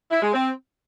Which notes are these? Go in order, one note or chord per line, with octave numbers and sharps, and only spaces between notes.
E4
G#3
C4